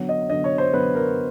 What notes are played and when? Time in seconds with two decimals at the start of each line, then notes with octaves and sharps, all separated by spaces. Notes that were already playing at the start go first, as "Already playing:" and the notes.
Already playing: D3 F#3 B3
0.09 D#5
0.30 D3 F#3 B3 D#5
0.44 C#5
0.58 C5
0.73 D3 F#3 B3 B4
0.95 A#4